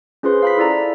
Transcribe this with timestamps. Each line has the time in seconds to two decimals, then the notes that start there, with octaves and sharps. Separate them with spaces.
0.23 C#4 F4 G#4 B4 C5 C6
0.42 F5 B5 B6
0.57 E4 A4 D5 A#5